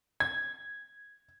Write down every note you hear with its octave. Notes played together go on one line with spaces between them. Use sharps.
G#6